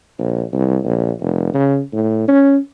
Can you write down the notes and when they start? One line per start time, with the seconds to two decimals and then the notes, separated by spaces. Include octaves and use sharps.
0.18 A#1
0.53 C2
0.84 A#1
1.20 F1
1.54 C#3
1.93 A2
2.28 C#4